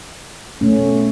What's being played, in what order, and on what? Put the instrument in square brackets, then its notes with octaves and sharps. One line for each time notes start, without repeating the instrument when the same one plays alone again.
[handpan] B2 A3 C#4